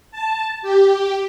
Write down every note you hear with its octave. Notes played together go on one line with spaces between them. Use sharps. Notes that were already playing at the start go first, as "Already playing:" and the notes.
A5
G4